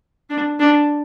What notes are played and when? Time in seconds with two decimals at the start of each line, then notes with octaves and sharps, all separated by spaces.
0.30 D4
0.60 D4